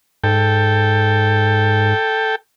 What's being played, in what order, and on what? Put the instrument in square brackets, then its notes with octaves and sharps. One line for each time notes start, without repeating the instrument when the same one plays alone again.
[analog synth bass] G#2 [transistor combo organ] A4 G5